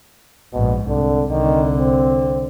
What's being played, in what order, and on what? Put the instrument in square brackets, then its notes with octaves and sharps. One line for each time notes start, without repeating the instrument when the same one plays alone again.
[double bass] A#1 G#2 [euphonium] B2
[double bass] C2 [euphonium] D3
[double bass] C2 D3 [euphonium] D#3
[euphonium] C4